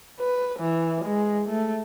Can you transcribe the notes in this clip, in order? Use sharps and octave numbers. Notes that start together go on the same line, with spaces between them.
B4
E3
G#3
A3